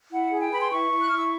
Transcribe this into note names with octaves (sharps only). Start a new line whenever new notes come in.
E4 F#5
G#4
G5
B4 B5
C6
E4 C#6
E4
F#6
F6
E4 E6